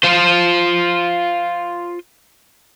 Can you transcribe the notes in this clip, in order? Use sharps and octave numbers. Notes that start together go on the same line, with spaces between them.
F4 C5